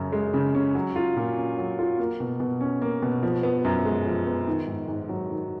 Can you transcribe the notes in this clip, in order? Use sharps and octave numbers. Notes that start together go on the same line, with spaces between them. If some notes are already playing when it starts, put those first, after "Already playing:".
Already playing: F#2 C#3 C#4
G#3
C#3
C#4
F#3
F4
A#2
C#4
F#3
F4
A#3
B2
B2
C#4
A#3
B2
F3
B3
F#2
G#3
F3
B3
D#3
G#2
G#2
F#3
D#3